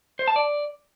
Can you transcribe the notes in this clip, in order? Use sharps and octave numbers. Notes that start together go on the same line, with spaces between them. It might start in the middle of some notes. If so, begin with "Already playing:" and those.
C5
A5
D5